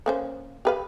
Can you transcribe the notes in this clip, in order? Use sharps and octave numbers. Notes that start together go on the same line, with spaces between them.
A#3 C#4 C5
G4 B4 F5